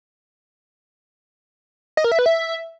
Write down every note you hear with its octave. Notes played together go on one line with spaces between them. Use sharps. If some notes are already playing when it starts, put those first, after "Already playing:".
D#5
A#4
E5
B4
E5